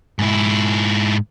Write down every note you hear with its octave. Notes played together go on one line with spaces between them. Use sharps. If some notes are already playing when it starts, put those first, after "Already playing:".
G#2 E4